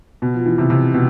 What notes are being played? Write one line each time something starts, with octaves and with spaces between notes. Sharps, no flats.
B2
F3
E3
C3
C3
B2